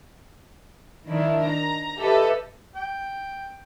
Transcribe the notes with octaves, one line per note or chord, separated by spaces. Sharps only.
D#3 D4 E4
A#5
G4 A4 B4 D#5 E5
G5